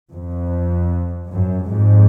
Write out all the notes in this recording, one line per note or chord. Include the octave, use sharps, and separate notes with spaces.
F2
F#2
F2 G#2